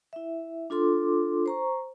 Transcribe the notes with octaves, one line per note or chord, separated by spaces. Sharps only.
E4 E5
D4 F4 A4 C6 D6
C5 A#5 C#6